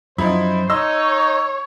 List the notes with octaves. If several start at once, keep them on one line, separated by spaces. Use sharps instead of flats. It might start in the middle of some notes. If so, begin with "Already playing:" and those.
F#2 F3 D#4 E4 C5
D#4 C#5 D#5 A5 C6 E6